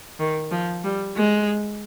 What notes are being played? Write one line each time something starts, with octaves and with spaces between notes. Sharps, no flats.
D#3
F3
G3
G#3